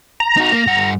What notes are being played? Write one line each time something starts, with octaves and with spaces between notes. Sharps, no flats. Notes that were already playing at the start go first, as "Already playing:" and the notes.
A#5
D#4 F#4
A#3
G2 F#5